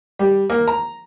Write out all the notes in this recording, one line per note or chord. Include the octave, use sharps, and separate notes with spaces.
G3
A#3
A#5